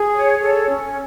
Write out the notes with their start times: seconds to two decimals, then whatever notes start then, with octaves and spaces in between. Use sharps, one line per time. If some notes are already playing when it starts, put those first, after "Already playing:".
Already playing: G#4
0.14 C#5
0.42 A4
0.70 C#4